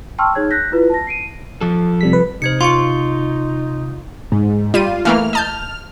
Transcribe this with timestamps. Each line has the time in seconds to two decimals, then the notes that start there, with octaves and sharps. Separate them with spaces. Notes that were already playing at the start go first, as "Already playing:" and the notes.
0.18 G5 A5 C6 C#6 E6 F6
0.35 D#4 G#4 C#5 G#6
0.50 F#6 G6 A#6 B6
0.72 E4 F4 B4
0.90 A5 A#6
1.07 C7 D7 D#7
1.61 F3 A4
2.01 C3 G3 B6
2.13 B4
2.42 C3 D#4 C5 G#6 C#7
2.61 F4 C6 C#6 C#7
4.32 G#2
4.74 G3 F4 D#7
5.05 E3 A3 A#3 F6
5.33 D#5 A5 F6 G6